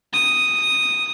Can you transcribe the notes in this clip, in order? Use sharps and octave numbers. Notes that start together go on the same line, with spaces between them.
D#6